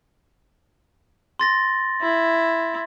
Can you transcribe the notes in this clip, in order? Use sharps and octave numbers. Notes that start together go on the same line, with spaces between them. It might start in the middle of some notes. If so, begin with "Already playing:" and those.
C6 A6 A#6
E4